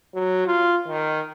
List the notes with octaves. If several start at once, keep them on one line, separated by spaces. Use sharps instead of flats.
F#3
F4
D#3